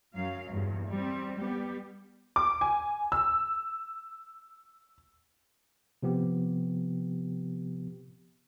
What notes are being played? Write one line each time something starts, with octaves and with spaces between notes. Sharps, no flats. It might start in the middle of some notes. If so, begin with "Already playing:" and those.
F#2 F#3 F5
E2 G2 A#2
G3 C4
G3 B3 G4
D6
G#5
E6
C3 F3 B3 G4